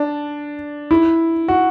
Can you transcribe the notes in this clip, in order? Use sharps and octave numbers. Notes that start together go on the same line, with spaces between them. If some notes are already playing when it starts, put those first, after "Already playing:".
Already playing: D4
E4
F#4